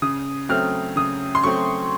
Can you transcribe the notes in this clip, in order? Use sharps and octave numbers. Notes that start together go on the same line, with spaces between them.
C#3 D#6
F#3 A3 C4 F6
C#3 D#6
C6
F#3 A3 C4 C#6